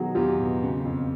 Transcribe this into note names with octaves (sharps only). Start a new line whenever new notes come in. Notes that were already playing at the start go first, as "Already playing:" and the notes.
Already playing: B2 D#3 F#3 F#4 G#4
E2 F4 G4
B2
C#3
F2